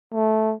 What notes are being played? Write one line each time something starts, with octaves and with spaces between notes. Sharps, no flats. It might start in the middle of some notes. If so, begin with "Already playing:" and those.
A3